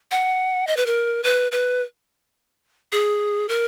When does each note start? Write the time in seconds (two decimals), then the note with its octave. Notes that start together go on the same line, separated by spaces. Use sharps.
0.11 F#5
0.67 D#5
0.77 B4
0.86 A#4
1.24 B4
1.52 B4
2.92 G#4
3.49 A#4